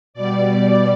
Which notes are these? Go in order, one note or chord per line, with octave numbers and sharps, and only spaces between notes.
B2 G3 D5